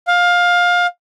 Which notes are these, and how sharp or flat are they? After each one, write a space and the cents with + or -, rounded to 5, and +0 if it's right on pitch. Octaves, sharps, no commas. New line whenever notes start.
F5 +20